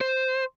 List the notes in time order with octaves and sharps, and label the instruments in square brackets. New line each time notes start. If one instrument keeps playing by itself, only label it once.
[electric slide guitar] C5